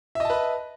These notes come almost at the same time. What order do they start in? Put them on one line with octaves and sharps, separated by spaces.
E5 D#5 A5 B4